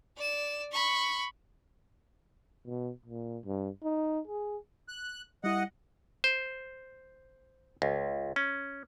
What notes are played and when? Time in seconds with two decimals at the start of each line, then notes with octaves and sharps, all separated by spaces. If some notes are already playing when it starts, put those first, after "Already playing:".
0.17 D5 E7
0.71 B5 C#6
2.66 B2
3.06 A#2
3.45 G2
3.84 D#4
4.28 G#4
4.88 F#6
5.44 G3 E4 D#5 F#5
6.24 C5
7.82 C#2
8.36 C#4